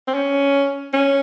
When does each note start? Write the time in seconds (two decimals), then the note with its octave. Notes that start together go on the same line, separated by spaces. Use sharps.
0.07 C4
0.14 C#4
0.93 C#4